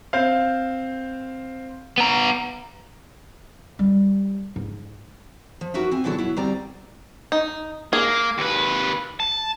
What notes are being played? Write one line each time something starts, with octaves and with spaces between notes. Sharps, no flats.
C4 C5 F5
B3 A#5
G3
G#2
F3
D#4 F#4 A#4 B4 E5
C4 G#5
B2 D3 F#3 E4 F#4 A4
F#3 E4
D2 G3 C4 D5 A#5
D#4
A#3 G#4
D#2 B4
A5